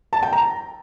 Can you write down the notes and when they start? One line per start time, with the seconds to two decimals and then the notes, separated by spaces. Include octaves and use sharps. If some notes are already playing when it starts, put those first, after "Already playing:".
0.13 A5
0.23 G5
0.33 A#5